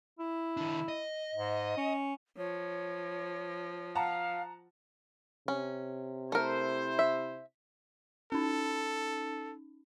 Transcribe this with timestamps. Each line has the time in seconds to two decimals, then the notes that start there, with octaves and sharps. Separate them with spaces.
0.19 E4
0.57 D#3 D4
0.88 D#5
1.35 G#2
1.77 C#4
2.37 F3 C#5
3.95 F5 F#5 A5 A#5
5.48 C3 C#4
6.32 A3 E4 A#4 C5
6.99 E5
8.32 C#4 D#4 A4